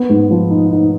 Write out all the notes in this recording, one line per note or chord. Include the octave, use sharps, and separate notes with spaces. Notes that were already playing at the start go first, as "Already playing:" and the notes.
Already playing: B3
G#2
F3
D#4
D#4